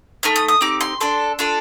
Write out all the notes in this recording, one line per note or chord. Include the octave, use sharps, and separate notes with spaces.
A3 D#4 F6
D#6
D#6
C4 D#4 G4 D6
C6
D4 A4 C6
D4 F4 A4